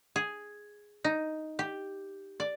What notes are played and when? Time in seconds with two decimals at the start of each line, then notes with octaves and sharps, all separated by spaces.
0.16 G#4
1.04 D#4
1.59 G4
2.40 D5